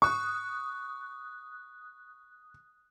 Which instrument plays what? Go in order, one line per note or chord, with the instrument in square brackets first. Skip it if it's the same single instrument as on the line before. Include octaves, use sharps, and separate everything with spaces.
[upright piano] C#6 [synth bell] D#6 F#6